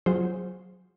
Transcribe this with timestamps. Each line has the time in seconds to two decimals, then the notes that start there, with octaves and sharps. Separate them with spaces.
0.06 F#3 F4 G#4 C5